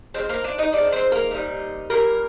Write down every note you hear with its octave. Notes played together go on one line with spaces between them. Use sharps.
F3 G#3 C4 D#4 C5
A#3 A#4
D4 D5
D#4 D#5
F3 G#3 C4 D4 D#4 D5
C4 C5
A#3 A#4
A#2 G3 C4 D#4
A#2 G3 A#3 A#4